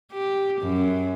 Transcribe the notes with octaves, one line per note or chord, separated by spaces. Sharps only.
G4
F#2